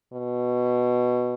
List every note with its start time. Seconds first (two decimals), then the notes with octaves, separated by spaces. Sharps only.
0.13 B2